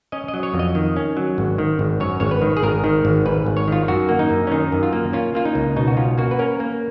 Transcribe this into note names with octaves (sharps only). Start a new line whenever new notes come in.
C#4 D#5
D#5
F#3
C#5
F2
D#5
D#3
C#4
F#3
G#1
D#3
G#1
F#2 C#5
G#1 C#5
B4
D#3
G#4
G#1 A#4
D#3
G#1
G#2 B4
G#1
C#5
D#3 F4
F#2 F#4
A#3
D#4
F#2
C#4
D#3 D#4
F#2
F4
A#3
C#4 F4
A#3 F4
D#4
C#2
B2 D#4
F#4
C#4 F4
A#3 F#4
B4
C#4 A#4
A#3